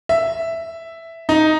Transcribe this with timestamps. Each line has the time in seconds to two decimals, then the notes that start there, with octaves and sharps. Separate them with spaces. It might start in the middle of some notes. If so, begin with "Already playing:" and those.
0.09 E5
1.29 D#4